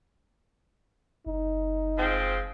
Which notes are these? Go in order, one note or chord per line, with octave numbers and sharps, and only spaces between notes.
F#1 D#4
F3 G#3 C4